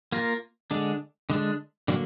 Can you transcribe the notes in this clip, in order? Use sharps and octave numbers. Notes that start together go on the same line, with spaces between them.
A#3 F4 A#4
D3 G#3 D4
D3 G#3 D4
D3 F#3 A#3